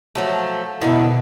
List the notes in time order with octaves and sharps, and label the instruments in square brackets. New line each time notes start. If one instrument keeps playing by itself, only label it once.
[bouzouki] F3 F#3 A3
[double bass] B2 [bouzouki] D3 D#3 A3 [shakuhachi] E4